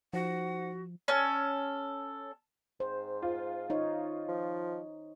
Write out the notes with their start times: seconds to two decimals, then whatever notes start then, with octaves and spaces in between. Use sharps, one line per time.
0.13 F3 D#4 F#4 C5 F#5 A#6
1.08 C#4 A4
2.80 G#2 C5
3.22 F4
3.70 D#4 C#5
4.29 F3